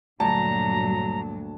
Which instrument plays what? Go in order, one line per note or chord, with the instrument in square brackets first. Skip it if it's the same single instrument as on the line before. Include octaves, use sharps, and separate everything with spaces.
[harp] D2 [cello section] G2 A#2 F#3 [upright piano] A5 [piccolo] A#5